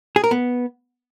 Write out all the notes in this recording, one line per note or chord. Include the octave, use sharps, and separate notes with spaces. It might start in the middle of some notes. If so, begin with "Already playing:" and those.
G#4
A#4
B3